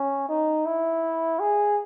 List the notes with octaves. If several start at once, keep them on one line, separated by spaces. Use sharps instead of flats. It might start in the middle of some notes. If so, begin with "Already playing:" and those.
Already playing: C#4
D#4
E4
G#4